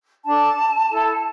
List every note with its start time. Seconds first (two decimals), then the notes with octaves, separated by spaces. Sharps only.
0.26 D4 A4 A5
0.89 E4 A4